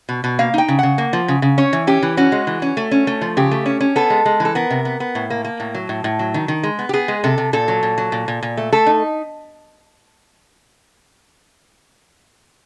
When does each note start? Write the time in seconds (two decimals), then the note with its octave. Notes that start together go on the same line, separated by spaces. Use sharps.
0.09 B2
0.24 B2
0.39 A#3 F5
0.54 D#4 G5
0.68 C#3
0.79 C#3 F#5
0.98 A#3
1.13 F3
1.28 C#3
1.42 C#3
1.58 C#4 C#5
1.73 E3
1.87 C#4 G4
2.03 E3
2.17 C#4 F#4
2.32 G#3
2.47 E3
2.62 C#4
2.77 A3
2.91 C#4
3.07 A3
3.21 F3
3.37 C#3 G4
3.51 A3
3.66 C#4
3.81 C#4
3.96 B3 A4
4.10 G#3
4.25 G#3
4.40 E3
4.45 A4
4.55 B3 A#4
4.70 C3
4.85 B3
5.00 B3
5.15 A2
5.30 A#3
5.45 A#3
5.60 A2
5.75 F#3
5.89 A2
6.04 A2
6.19 F#3
6.34 D#3
6.48 D#3
6.63 G#3
6.79 B3
6.89 G4
6.93 B3 G#4
7.08 G#3
7.24 C3 A4
7.38 C3
7.53 A#2 A4
7.68 F#3
7.83 A#2
7.98 F#3
8.12 A#2
8.28 A#2
8.43 A#2
8.57 A3
8.73 A3 A4
8.86 D#4